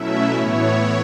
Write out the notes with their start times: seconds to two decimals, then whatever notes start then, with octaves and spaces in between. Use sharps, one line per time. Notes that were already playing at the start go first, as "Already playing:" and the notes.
Already playing: B2 F#3 A3 C#4 E4 E5
0.33 A2 E3 B3 E4 C#5